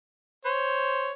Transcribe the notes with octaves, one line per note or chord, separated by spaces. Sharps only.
C5 C#5